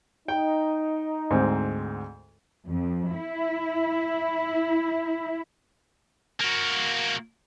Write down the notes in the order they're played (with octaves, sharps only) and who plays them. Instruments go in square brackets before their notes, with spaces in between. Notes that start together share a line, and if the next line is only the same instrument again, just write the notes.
[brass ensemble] D#4 [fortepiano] G5
[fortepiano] D2 G#2 C4
[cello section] F2
E4
[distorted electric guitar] A#3 F#4